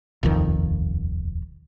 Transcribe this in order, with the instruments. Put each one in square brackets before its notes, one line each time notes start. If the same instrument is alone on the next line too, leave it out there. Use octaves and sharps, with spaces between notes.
[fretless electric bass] D#1 C2 F2 D#3